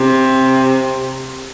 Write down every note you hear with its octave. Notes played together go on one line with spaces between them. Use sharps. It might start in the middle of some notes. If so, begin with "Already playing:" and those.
Already playing: C3